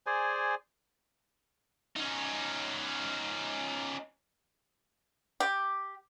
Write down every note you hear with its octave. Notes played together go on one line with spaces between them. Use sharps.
G#4 C5 D5 G#5
C#4 D#4
G4